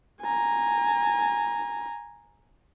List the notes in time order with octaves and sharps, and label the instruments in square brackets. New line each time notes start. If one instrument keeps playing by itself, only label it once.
[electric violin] G#5 A#5